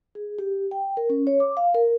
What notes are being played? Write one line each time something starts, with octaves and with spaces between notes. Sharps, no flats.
G#4
G4
G5
A#4
C#4
C#5
D6
F5
A#4